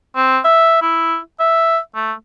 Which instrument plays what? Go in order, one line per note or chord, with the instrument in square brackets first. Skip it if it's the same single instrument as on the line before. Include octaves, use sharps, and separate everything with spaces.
[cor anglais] C4
E5
E4
E5
A3